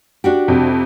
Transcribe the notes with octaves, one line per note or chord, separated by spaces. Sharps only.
D4 F#4 G4
F2 C3